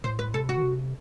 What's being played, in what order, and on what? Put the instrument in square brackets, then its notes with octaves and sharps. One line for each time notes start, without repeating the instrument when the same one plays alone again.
[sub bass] A2 [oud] C5
[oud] B4
[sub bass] C3 [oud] A4
[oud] F#4
[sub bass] D#3
C3